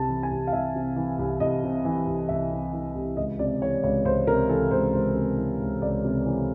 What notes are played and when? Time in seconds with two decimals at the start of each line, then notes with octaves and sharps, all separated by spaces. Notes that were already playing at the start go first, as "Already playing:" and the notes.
Already playing: C2 C3 A5
0.08 E3
0.23 G#5
0.31 C2
0.47 F5
0.53 C2 E5
0.75 C3
0.96 E3
1.19 C2
1.40 C2 D#5
1.64 C3
1.85 E3
2.07 C2
2.29 C2 E5
2.51 C3
2.73 E3
2.95 C2
3.17 C#2 D#5
3.39 C3 D5
3.61 E3 C#5
3.83 C#2 C#5
4.05 C#2 C5
4.27 C3 A#4
4.49 E3 A4
4.71 C#2 C5
4.93 C#2 C5
5.16 C3
5.37 E3
5.60 C#2
5.82 C#2 D5
6.04 C3
6.25 E3